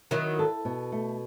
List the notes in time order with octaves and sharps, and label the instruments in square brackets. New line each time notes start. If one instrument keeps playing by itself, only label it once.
[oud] D#3 F#3 [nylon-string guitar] E4
[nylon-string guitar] A4
B2
A3